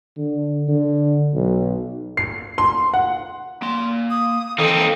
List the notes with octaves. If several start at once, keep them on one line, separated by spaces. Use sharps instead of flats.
D3
D3
B1
C7
C6
F#5
A#3 C6
D#6
E3 A#3 C4 D#4 A4